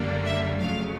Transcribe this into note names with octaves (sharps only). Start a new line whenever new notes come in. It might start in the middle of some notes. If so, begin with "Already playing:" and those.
Already playing: F#2 D3 G3 A#3 D4
E5
F2 C#3 F#3 A3 F5